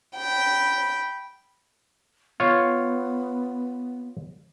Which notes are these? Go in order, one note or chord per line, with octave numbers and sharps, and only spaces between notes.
G5 B5
B3 F4 C#5